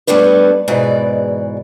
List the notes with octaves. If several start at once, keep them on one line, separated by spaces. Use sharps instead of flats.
G3 A3 B3 D4 B4
E2 G#2 B2 E3 D5